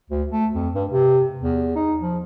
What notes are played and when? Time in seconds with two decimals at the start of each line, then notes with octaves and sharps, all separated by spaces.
0.10 D2
0.31 A3
0.54 F2
0.74 G2
0.89 C3
1.42 E2
1.75 D#4
1.99 F3